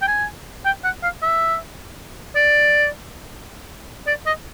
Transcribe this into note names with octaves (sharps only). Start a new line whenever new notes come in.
G5
G#5
G5
F#5
F5
E5
D5
D5
D#5